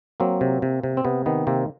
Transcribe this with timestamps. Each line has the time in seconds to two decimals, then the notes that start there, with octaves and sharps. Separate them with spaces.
0.20 F#3 A#3 C4
0.41 C3
0.62 C3
0.83 C3
0.97 C4
1.05 C3 B3
1.26 D#3 B3
1.47 C3 A#3 C4